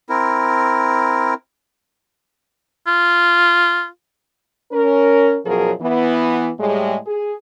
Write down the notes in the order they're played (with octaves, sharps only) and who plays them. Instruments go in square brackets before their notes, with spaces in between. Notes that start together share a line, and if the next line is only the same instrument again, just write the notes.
[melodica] C4 E4 A#4
[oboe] F4
[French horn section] C#4 A#4
F#2 B2 F3 F#3 G#4 A#4
E3 B3
A2 G3 G#3
G#4